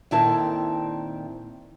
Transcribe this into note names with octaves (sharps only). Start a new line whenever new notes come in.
A#2 D#3 C4 E4 A4 A5